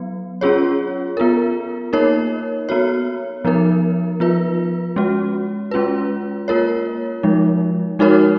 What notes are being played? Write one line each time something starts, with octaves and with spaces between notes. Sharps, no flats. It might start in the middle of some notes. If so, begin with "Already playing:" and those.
Already playing: F#3 B3
C#4 F4 G#4 C#5
B3 F4 A#4
A#3 D#4 A#4 C#5
B3 F#4 C#5
F3 B3 D#4 A#4
F3 B3 F4 B4
G#3 C#4 F#4
G#3 C#4 F4 B4
A#3 F4 A#4 C#5
F3 G#3 D#4
G#3 D#4 F#4 A#4 C#5